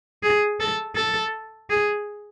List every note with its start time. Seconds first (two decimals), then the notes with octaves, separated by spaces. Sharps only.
0.23 G#4
0.60 A4
0.95 A4
1.70 G#4